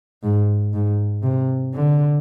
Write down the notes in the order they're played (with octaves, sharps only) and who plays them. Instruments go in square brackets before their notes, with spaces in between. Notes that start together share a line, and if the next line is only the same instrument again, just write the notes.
[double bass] G#2
G#2
C3
D3